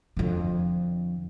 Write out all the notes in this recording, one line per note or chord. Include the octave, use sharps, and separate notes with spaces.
F2 D3